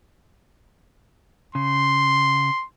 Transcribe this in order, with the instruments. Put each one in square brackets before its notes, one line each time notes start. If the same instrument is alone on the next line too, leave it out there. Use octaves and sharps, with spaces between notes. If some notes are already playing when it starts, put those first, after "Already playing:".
[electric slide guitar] C#3 [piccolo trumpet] C6